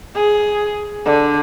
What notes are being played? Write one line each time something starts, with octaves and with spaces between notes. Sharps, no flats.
G#4
D3